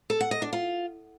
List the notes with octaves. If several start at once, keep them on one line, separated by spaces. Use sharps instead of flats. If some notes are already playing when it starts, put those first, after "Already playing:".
A4
F#5
D#5
D4
F4